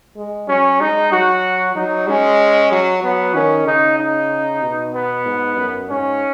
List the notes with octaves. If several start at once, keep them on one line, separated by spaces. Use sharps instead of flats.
G#3
F#3 C#4
G#3 D#4
F#3 F#4
F#3 D#4
G#3 C#4
F#3
F#3 B3
D#3 C#4
C#3 D#4
D#4
B2
B3
G#2
F#2
G#2 C#4